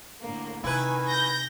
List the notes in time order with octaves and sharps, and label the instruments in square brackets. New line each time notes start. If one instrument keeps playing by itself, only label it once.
[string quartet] A2 D3 A#3
[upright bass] C3 [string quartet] D#3 G#5 [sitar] E4 B4
[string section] G6 A#6